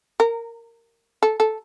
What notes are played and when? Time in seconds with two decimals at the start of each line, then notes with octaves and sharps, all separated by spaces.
0.20 A#4
1.23 A4
1.40 A4